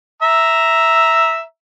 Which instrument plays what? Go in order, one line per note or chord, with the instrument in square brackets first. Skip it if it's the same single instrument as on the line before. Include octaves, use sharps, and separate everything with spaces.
[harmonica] E5 A#5 E6